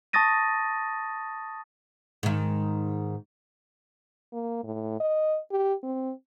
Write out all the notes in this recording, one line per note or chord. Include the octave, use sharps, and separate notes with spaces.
A5 C#6 D#6 A6 A#6 D#7
G#2 D#3
A#3
A2
D#5
G4
C4